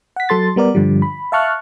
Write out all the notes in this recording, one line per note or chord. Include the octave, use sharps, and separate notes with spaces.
F#5 B6
F#3 A4 C6 A6
G3 B3 A#4 D5
G2 D3 F3 G3
B5
E5 F5 A5 C#6 F6 F#6